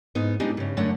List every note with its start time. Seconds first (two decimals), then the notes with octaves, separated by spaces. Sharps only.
0.15 G#2 B3 D#4
0.40 G3 G#3 B3 D4 D#4 G4
0.57 G2 C#3
0.77 F#2 D3 F#3 A3 F#5